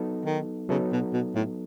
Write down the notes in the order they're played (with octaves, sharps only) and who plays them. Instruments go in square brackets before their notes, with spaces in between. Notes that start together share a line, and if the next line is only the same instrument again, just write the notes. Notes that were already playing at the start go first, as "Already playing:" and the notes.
Already playing: [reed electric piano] F#3 B3 D#4 A4
[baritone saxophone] D#3
[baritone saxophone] C#3 [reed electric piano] F#3 B3 D#4 A4
[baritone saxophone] B2
B2
A2